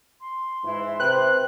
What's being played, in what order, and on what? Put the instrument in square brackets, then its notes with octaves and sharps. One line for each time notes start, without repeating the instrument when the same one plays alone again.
[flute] C6
[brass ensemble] G#2 E3 E4
[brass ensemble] C3 [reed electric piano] B4 C5 G5 [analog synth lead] F#6